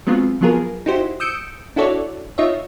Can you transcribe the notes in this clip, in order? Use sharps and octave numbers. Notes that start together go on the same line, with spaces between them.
F#3 G#3 B3 C4 F4
F3 F#3 B3 F4 G#4 A#4
D#4 E4 F#4 G4 C5
D#6 E6 G6 C#7 D7
D4 E4 F#4 A4 C#5 D5
D#4 F4 C#5 D#5 E5